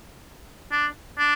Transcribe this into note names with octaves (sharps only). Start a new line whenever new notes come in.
D4
D4